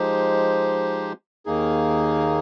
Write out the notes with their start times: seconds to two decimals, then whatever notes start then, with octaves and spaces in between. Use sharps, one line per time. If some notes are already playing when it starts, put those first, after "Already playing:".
Already playing: F3 G#3 D#4 G4 C5
1.46 D#2 D#3 A#3 D#4 G#4